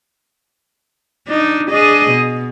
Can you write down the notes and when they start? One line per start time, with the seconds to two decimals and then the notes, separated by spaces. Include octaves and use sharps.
1.28 D4 D#4
1.70 D4 G#4 D#5
2.11 B2